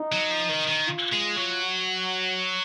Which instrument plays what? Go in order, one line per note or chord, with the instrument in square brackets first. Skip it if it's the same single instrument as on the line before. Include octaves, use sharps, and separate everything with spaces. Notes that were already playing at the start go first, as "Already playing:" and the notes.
Already playing: [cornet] D#4
[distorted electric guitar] F#3
F3
D#3
D#3
[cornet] F4
[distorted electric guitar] G#3
F#3
[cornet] F#4